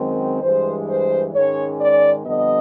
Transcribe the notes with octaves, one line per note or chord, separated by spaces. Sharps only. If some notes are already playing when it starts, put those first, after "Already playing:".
Already playing: F#2 D#3 G#3 C4
G2 E3 G#3 C5
C5
G#2 D#3 G#3 C#4 C#5
D5
F2 D3 G3 B3 D#5